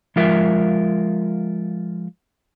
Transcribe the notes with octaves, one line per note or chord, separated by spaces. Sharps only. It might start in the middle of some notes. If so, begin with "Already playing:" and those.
F3 G#3 F4 A#4 E5